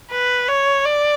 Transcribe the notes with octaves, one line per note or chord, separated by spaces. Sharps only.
B4
C#5
D5